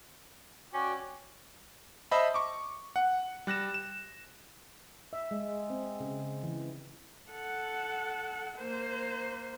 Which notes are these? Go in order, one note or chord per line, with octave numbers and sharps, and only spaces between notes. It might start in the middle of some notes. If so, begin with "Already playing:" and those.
C#4 F#4 D5 G5
C5 D#5 E5 A5 B5
C#6 D6
F#5
G3 F#6 A#6 E7
E7
E5
G#3
C4
C#3
E3
A4 F#5
A#3 C5